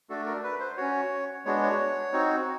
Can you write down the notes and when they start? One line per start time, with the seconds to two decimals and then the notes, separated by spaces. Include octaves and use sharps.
0.10 A3 D4 F#4 A4
0.26 A#4
0.43 B4
0.60 C5
0.77 C#4 F#4 C#5
1.45 G#3 B3 D4 F#4 C#5
1.62 C#5
2.13 C4 D#4 F#4